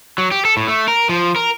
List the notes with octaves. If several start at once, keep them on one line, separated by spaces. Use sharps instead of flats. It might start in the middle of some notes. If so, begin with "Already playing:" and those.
F#3
G4
A4
A2
A3
A#4
F3
A#4